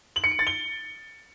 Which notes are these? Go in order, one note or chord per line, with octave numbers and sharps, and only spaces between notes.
F#7
C#7
D7
A6
G7